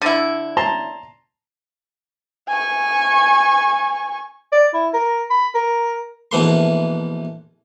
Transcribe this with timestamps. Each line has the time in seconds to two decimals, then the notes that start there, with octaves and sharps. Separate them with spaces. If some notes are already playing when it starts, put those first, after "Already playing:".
0.02 D3 E4
0.57 A5 A#5 C6
2.48 G#5 C#6
4.52 D5
4.73 E4
4.93 A#4
5.30 B5
5.55 A#4
6.31 A#1 B2 E3 A3 C6